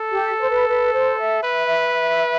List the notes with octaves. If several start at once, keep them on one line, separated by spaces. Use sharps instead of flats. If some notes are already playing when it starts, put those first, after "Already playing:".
Already playing: A4
G4
C5
B4
B4
C5
E5
B4